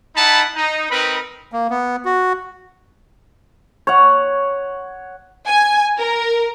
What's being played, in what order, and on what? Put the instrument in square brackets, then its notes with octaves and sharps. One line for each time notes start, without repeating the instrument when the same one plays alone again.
[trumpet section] D#4 E4 F#5 A5 B5
D#4
C4 D#4 A#4 B4 B5
[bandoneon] A#3
B3
F#4
[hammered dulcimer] C#5 F#5
[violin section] G#5
A#4